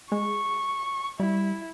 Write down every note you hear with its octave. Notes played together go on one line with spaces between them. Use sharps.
G#3 C#6
G3 E4